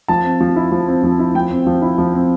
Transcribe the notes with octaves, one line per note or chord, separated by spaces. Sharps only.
F3 A5
C4
F3
E4
F3
C4
F3
E4
F3 G5
C4
F3
E4
F3
C4